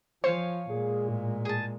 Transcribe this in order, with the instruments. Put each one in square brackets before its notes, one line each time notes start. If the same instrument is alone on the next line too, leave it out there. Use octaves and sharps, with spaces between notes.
[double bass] F3 [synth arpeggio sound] C5 [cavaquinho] C#5 F5 G#5
[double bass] A#2 G#3 [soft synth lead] G#4
[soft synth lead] A2
[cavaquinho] G#4 A5